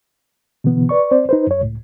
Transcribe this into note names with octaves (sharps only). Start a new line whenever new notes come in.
B2 D3 E3 B3
B4 D5 C#6
C4 C5 D5
D#4 B4 C5
F#2 C#5
C#2 A2